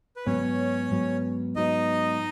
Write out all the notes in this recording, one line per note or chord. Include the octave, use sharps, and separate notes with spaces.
B4
G#2 F#3 B3 C#4 C#5
G#2 F#3 B3
G#2 F#3 B3 D#4 D#5